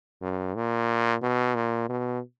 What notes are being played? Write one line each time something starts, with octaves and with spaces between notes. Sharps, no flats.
F#2
A#2
B2
A#2
B2